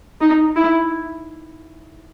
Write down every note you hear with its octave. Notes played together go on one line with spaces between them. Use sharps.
D#4
E4